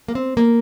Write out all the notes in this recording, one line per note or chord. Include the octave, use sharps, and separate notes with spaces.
A#3
C4
A#3